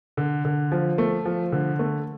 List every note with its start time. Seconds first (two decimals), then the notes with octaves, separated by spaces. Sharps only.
0.17 D3
0.45 D3
0.72 F3
0.98 A3
1.26 F3
1.52 D3
1.79 A3